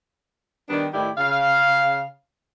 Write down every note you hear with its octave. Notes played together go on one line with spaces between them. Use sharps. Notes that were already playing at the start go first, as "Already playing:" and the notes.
D#3 G3 B3 D4
A2 D#3 E4 G4 D5
C#3 F5